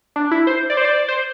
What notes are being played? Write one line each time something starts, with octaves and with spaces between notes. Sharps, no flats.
D4
E4
C5
D5
C5
D5
C5